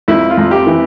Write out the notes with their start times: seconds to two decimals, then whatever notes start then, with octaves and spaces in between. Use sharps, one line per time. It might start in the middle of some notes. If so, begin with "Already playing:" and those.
0.08 F2 E4
0.30 F4
0.37 F2
0.51 G4
0.66 E3